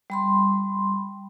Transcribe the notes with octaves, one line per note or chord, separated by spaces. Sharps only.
G3 B5 C6